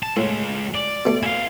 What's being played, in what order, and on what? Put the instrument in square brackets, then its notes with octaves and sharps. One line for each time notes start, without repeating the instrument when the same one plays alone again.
[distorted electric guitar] A5
[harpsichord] A2 [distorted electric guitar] G#3 F4
[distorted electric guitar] D5
[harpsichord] B2 A3
[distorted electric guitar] E4 F5 [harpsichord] G#5